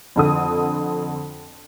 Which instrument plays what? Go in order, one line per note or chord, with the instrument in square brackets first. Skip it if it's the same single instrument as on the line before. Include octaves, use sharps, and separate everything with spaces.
[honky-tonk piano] F2 D3 D#6